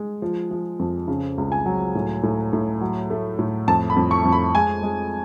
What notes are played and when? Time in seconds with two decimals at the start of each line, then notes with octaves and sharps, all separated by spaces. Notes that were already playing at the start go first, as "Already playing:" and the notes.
Already playing: G#3
0.22 F3
0.51 F3
0.79 F2
1.08 C#3
1.38 C#2
1.52 G#5
1.66 F#3
1.95 A2
2.23 A2
2.53 A2
2.81 F#3
3.10 A3
3.39 A2
3.68 F2 A5
3.90 B5
3.96 F2
4.11 C#6
4.25 F2
4.32 B5
4.55 G#3 G#5
4.83 G#3